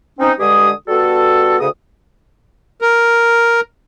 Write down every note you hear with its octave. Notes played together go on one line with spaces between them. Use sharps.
C4 C#4 D#4
G2 D3 G#3 G4 G#4 D#6
G3 B3 F#4 A4
D2 C#3 D#6
A#4